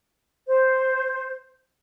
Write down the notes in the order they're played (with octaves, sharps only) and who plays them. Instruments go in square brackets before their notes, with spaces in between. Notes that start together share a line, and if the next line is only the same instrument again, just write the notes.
[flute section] C5